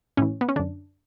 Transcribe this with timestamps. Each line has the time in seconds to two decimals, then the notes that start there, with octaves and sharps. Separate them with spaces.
0.17 A2 E3 C#4
0.41 B3
0.49 C#4
0.56 F#2 D3 D4